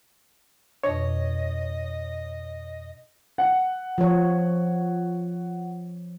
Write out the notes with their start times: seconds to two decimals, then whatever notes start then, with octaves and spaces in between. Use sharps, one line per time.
0.84 F2 B2 D4 C#5 D#5
3.38 F#5
3.98 F3 C#5